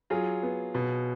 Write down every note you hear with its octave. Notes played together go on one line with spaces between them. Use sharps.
F#3 F4 G#4
B3
B2